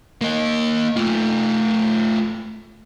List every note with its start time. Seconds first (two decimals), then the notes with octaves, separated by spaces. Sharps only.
0.21 A#3 D#5
0.96 A3 F4